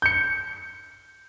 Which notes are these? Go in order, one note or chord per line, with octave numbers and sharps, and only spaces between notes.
G6 C#7